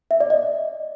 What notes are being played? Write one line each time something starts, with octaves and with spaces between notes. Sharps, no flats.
E5
D5
D#5